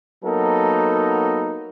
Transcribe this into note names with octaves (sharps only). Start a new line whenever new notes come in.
F#3 A#3 B3 D#4 A4 A#4